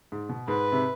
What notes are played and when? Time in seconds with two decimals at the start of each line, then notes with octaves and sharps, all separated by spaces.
0.12 G#2
0.29 B2
0.48 G#2 B4
0.72 C3